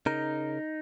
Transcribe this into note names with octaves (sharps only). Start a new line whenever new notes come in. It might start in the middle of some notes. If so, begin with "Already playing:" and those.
C#3 D#4 A#4